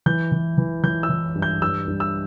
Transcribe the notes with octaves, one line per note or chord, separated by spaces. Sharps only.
E3 G6
E3
E3
E3 G6
E6
E3
G2
G6
G2 E6
G2
E6